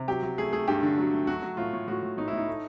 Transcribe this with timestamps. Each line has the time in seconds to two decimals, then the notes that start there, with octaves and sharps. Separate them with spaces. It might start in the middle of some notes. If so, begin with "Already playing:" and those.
Already playing: C3
0.08 F#3 G4
0.23 F#3
0.38 A3 G#4
0.52 A3 G#4
0.68 G2 G4
0.83 D3
0.98 F#3
1.13 A3
1.27 F#3 F#4
1.42 F#3
1.57 A2 F4
1.73 A2
1.87 A2 F#4
2.02 A2
2.18 A2 D#4
2.28 E4
2.33 A2 D#4
2.48 A3